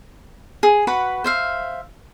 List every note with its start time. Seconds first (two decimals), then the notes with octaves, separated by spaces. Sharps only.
0.63 G#4
0.87 F#4 B4 F#5 B5
1.24 C5 E5 F5